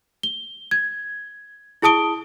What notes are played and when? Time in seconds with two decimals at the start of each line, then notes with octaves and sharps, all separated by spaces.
0.23 G7
0.71 G#6
1.82 E4 G#4 A5 D#6 D7 G7